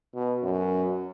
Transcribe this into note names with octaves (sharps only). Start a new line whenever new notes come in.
B2
F#2